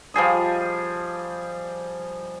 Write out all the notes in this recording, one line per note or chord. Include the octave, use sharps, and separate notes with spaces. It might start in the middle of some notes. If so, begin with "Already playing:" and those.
F3 G3 G#4 D#5